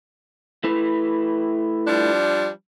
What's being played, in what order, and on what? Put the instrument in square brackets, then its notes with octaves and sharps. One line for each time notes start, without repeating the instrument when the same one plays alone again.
[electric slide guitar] A3 E4 B4
[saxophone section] F3 G3 D4